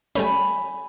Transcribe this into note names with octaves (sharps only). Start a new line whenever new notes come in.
G3 A3 C#4 G#5 B5